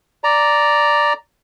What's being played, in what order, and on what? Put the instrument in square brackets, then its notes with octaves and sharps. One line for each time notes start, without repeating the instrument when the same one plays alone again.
[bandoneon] D5 A#5